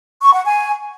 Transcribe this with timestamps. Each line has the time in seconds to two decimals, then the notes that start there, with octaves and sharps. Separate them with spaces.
0.22 C#6
0.34 F#5
0.45 G#5